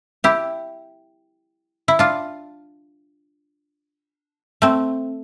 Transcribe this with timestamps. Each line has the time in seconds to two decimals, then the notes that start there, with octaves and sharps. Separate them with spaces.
0.24 E4 G4
1.88 E4
1.99 D4 F4
4.62 A3 C4